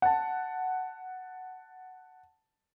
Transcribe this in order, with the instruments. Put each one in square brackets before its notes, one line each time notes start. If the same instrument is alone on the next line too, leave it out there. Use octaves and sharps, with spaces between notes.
[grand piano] F#5 A5